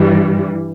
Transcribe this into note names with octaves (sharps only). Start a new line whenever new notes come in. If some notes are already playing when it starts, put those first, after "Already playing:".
Already playing: G2 E3 G3